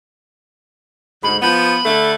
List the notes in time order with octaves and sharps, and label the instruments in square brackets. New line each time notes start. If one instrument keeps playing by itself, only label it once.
[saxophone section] D2 G#2 [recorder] B5
[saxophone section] F3 B3 [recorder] B5
[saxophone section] D3 A3